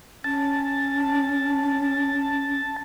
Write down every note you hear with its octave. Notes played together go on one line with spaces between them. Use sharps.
C#4 A5